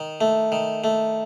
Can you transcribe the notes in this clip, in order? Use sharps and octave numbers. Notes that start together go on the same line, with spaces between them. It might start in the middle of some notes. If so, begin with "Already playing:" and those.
Already playing: D#3
A3
D#3
A3